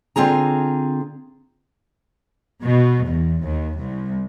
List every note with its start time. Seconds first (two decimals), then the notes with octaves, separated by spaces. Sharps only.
0.16 D3 C4 F4 G#4 A#5
2.63 B2
3.06 E2
3.44 D#2
3.79 C2